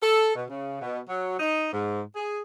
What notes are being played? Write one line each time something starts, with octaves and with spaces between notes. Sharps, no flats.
A4
B2
C#3
B2
F#3
D#4
G#2
G#4